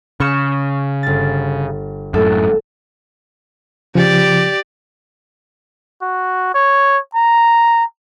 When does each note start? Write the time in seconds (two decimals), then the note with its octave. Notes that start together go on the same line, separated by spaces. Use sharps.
0.20 C#3 C#6 F6 E7
1.03 G1 A6
2.14 F#2 A2 A4
3.95 C#3 F3 G4 D5
6.02 F#4
6.54 C#5
7.15 A#5